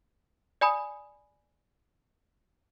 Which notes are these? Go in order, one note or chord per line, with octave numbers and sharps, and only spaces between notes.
D5 G#5 B5 D#6